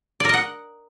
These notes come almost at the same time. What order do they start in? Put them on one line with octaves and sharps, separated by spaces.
D5 A#4 D#5 F#5